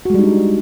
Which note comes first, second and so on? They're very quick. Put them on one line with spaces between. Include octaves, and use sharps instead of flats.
F#4 G#3 G3 D#4 D4